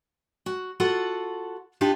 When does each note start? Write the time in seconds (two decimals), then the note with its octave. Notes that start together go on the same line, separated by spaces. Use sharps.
0.46 F#4
0.80 F4 F#4 A4 F#5
1.81 D4 D#4 F4 G4